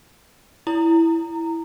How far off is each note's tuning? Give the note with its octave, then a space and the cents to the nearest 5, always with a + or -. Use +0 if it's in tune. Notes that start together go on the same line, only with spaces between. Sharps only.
E4 +5 A#5 -15